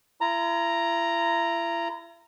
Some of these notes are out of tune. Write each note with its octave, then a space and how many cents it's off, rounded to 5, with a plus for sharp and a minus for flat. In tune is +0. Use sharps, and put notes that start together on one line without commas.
E4 +40 A#5 -5